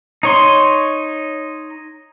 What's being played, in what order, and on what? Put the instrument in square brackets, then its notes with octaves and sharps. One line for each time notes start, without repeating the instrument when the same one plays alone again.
[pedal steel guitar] D#4 C#5 C6